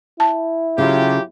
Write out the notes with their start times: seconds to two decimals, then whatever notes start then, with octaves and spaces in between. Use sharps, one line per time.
0.20 E4 A5
0.78 C#3 F#3 F4 G4